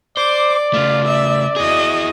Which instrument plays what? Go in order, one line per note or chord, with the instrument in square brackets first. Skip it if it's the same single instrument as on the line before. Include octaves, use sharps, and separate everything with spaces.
[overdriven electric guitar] C5 [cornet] D5 [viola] D6
[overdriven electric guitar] C#3 A3 [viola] F4
[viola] E5
[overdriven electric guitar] E4 G#4 [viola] F#4 D#5